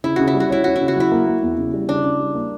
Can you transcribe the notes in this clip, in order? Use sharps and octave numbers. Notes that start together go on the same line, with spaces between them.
C#3 E4
C#3 F#4
E4
G3
F#4
C#4 E4
C#4 F#4
E4
C#3
F#4
F#3 E4
A#3
A#3
E2
C#3
G3
C#3 D4
C#3
G3
A#3